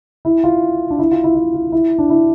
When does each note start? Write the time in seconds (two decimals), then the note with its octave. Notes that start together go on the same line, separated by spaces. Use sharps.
0.25 E4
0.44 F4
0.90 D4
0.99 E4
1.12 F4
1.24 E4
1.36 E4
1.54 F4
1.72 E4
1.99 D4
2.10 E4